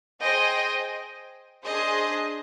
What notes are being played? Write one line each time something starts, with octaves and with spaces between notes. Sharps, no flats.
G#4 C5 D#5 G5
D4 G#4 C5 D#5